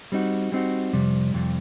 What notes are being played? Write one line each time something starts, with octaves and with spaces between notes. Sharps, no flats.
G3 C4 D#4 F#4
G3 C4 D#4 F#4
F2 C3 G3
F2 C3 G3